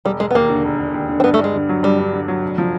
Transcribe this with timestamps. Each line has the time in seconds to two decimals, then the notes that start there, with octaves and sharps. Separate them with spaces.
0.05 E1 G3
0.20 E1 G#3
0.31 B3
0.35 D#2 A#3
0.50 D3
0.65 E1
0.80 E1
0.94 D#2
1.09 D3
1.20 C4
1.24 G2 B3
1.34 A3
1.39 G2
1.44 G#3
1.54 D3
1.69 F#3
1.83 G2 G3
1.98 G2
2.13 D3
2.28 F#3
2.42 F1
2.58 F3